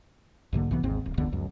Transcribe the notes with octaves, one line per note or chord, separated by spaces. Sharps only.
B1 G#2 D3 A#3
B1 C3 E3 B3
G#1 D#2 G#2 C4
D1
E1 C#2 D3 B3
C#2 F#2